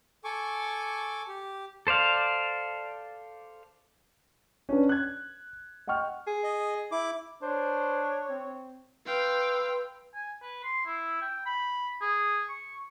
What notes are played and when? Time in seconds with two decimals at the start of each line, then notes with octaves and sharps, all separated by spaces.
0.24 A4 G#5 C#6 D6
1.28 G4
1.87 A4 C5 D5 F5
4.69 C#4 D4 B4
4.89 F#6 G#6
5.87 D#5 F#5 G5 C#6 F6
6.27 G#4
6.43 D#5
6.91 E4 D6
7.42 D4 C5 C#5
8.29 C4
9.06 B4 F5 G5 C6 E6
10.15 G#5
10.42 B4
10.64 C6
10.86 E4
11.22 G5
11.46 B5
12.02 G#4
12.49 C#6